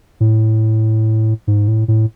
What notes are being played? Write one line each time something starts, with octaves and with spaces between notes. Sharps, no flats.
A2
G#2
A2
A2